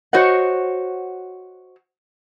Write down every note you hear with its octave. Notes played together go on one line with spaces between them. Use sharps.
F#4 C5 C#5 D#5 F#5